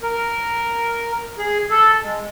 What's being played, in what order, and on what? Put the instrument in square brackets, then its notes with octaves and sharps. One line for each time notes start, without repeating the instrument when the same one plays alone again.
[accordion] A#4
G#4
A4
G#3